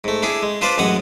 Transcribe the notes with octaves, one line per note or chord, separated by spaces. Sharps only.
G#2 A3
D4 E4 G#4
G#3
D4 F4 B4 C5 D5
A1 F#2 G#3 F#5 D#6